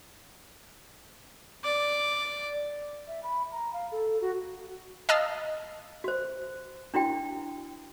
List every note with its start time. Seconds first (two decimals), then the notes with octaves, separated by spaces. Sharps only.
1.64 D5
3.08 E5
3.23 B5
3.52 A#5
3.74 F5
3.92 A4
4.21 F#4
5.09 D#5 F5 A5 E6 F6
6.04 F#4 C5
6.94 D4 E4 F#4 G5